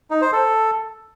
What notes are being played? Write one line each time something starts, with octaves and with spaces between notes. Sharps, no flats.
D#4
C5
A4